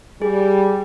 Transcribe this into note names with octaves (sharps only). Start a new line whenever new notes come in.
G3 G#4